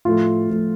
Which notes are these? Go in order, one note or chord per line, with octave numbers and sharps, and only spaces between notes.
A2 F3 A3 F4
A2 F3 A3